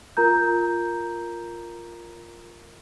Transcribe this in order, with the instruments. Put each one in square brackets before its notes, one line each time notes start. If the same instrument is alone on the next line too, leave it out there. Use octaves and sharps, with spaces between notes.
[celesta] F4 A#4 A#5 G6